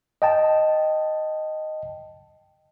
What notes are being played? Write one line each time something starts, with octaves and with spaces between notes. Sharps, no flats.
D#5 G5 A5